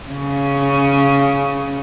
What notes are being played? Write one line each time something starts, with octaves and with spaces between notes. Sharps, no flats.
C#3 C#4